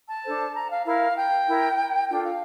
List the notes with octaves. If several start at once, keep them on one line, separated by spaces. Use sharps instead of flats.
A5
D4 A4 C5
A#5
F5
E4 A#4 F5
G5
E4 A#4
D4 F4 A4 G5
F5